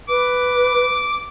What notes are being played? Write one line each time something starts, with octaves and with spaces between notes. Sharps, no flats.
B4 D6